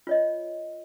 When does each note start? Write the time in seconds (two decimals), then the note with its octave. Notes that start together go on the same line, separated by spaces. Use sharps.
0.07 F4 C#5 D#5